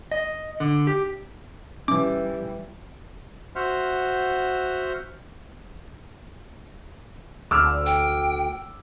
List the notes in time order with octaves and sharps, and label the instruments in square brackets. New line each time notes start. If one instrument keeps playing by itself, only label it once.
[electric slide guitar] D#5
D3
G4
[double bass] E3 G3 [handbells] C#4 D6
[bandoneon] F#4 C5 E5 F#5 C6 F6
[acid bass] D2 [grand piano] D6 E6 F6
[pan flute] G5